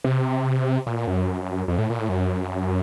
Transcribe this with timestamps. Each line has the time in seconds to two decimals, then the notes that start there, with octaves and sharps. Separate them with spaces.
0.04 C3
0.87 A#2
1.07 F#2
1.68 F2
1.78 A2
1.90 A#2
1.99 A2
2.09 F#2